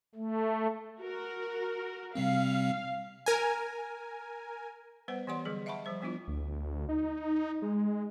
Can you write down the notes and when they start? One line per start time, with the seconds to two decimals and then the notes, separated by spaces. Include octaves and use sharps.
0.15 A3
1.01 F#4 A#4
2.15 C3 G3 C4 F5
3.26 A#4 G#5
5.08 G3 B3 B4 C5 F#5
5.27 E3 B3 G4 D5 F#5 C6
5.45 D3 F#3 G3 G#4
5.66 D#5 E5 F#5 A5 B5 C#6
5.85 F3 G3 C5 E5
6.01 F3 G3 B3 D4 E4 F4
6.28 D2
6.89 D#4
7.62 G#3